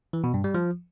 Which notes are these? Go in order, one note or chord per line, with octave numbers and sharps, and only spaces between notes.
E3
B2
G2
G3
F3